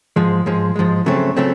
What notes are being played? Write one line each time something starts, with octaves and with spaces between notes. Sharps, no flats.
G#2 F3 G#3
G#2 F3 G#3
G#2 F3 G#3
C#3 F#3 A3 C4
C#3 F#3 A3 C4